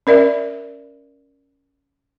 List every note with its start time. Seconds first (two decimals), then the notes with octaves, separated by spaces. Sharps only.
0.07 C#4 A#4 D5 E5